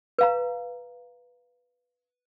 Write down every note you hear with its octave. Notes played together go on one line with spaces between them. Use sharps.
B4 F5 A#5